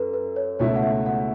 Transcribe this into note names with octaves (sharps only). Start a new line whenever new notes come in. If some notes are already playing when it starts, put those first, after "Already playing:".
Already playing: F#2 A4 B4
B4
C#5
C#2 B2 A3 E4 C#5
F#5
E5
F#5